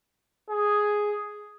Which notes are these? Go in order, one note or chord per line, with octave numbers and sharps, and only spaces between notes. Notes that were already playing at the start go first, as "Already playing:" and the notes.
G#4